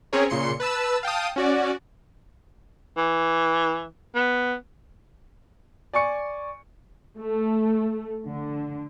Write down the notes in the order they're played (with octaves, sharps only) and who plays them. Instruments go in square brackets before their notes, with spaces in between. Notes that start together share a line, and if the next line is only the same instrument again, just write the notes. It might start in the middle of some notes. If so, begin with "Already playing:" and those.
[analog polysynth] C4 C#4 G#4 A#4 C#5
A#2 C#3 C6 C#7
B4 A5 E6
F5 G5 A5 D#6
C#4 F#4 D5
[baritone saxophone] E3
B3
[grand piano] D5 G#5 C#6 C#7
[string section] A3
D3